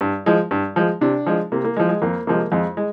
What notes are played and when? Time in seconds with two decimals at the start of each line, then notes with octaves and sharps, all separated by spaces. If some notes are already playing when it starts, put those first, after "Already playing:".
0.01 G2
0.26 F3 G#3
0.51 G2
0.76 F3 G#3
1.01 C3 D4
1.26 F3 G#3
1.52 C3 A#3
1.64 A#3
1.76 F3 G#3
1.89 G#3
2.02 F2 A#3
2.27 C3 F3 G#3 A#3
2.52 F2 G#3
2.77 G#3